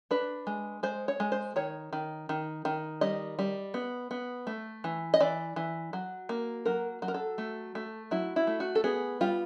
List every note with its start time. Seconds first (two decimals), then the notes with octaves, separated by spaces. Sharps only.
0.11 D4 B4
0.47 G#3
0.83 G#3 C5
1.08 C#5
1.20 G#3
1.32 C5
1.56 D#3 C#5
1.93 D#3
2.29 D#3
2.65 D#3
3.01 G3 D#5
3.39 G3
3.74 B3
4.11 B3
4.47 A3
4.84 E3
5.14 D#5
5.20 E3 D5
5.56 E3
5.93 F#3
6.29 A#3
6.65 F#3 A#4
7.02 F#3
7.08 A#4
7.14 A4
7.38 A3
7.75 A3
8.11 F#3 E4
8.36 E4
8.47 A3
8.60 F#4
8.75 A4
8.84 B3 G#4
9.21 G3 F4